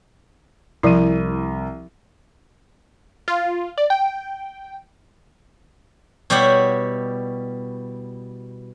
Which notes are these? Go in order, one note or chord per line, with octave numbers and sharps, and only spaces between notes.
C2 F3 E4 D#7
F4
D5
G5
B2 G3 E4 G4 C#5 F#5